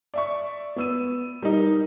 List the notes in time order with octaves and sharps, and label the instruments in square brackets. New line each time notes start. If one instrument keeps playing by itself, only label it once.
[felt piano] D5 E5 C#6
B3 E6 D#7
[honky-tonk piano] G3 D#4 [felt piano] A#4